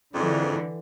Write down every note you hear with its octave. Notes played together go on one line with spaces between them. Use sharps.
F2 G#2 D3 E3 D4